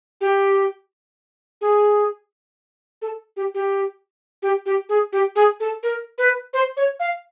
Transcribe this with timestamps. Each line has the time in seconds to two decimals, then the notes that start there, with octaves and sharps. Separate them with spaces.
0.21 G4
1.61 G#4
3.02 A4
3.37 G4
3.54 G4
4.43 G4
4.66 G4
4.89 G#4
5.13 G4
5.36 G#4
5.60 A4
5.83 A#4
6.18 B4
6.53 C5
6.77 C#5
7.00 F5